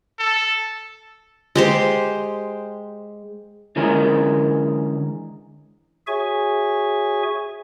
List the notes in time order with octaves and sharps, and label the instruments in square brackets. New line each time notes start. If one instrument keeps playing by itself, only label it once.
[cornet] A4
[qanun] G#3 G4 C5
[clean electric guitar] D3 E3 G#3 C#4 G#4 A#4
[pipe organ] F#4 G#4 C#5 E5 G#5 C#6